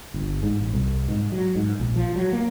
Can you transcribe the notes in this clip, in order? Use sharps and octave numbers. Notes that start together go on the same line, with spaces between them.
G1
G#2
A1
C2
G#2
F#3
G#2
A#1
F3
F#3
A#3